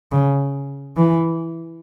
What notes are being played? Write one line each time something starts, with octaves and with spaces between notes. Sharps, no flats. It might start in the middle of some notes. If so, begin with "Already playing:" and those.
C#3
E3